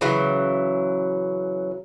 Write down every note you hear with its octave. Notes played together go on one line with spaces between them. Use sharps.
C#3 E3 F#3